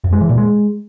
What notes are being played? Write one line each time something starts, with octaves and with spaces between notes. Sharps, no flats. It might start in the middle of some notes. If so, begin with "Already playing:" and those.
F#2
G#3
E3
A#2
G#3